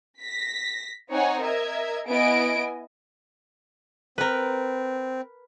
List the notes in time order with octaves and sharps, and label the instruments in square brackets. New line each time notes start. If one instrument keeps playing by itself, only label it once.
[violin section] A#6 B6
C4 D#4 C#5 F#5 G#5
A#4 D#5 E5 G#6
B3 E4 D#5 G#5 D7
[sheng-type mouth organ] C4 [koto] A#4 B4